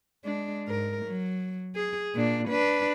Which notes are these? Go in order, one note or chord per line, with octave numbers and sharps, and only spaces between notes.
G#3 D4
G#2 A#4
F#3
G#4
A#2 D4
D4 B4